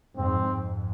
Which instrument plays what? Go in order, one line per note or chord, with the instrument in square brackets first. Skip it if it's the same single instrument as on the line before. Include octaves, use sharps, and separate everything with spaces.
[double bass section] F2 G#2 [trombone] C4
[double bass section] F2 G#2